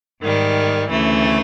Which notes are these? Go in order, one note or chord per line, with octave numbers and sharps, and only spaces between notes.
G#2 D#3 G3
D2 C#3 E3 A3